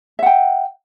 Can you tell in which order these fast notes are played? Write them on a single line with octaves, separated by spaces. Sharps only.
E5 F#5 G5